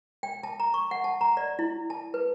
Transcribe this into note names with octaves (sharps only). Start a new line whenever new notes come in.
G5
A5
A#5
C#6
F#5
A5
A#5
D5
E4
A5
B4